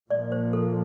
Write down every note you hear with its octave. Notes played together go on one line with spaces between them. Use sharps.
A#2 F3 A#3 D5
C5
A4